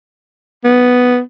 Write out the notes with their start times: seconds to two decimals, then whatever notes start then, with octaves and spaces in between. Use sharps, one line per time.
0.64 B3